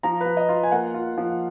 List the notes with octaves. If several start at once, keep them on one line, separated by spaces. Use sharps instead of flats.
F3 A#5
B4
F3
D#5
F4
G#5
A#3 F#5
F4
F3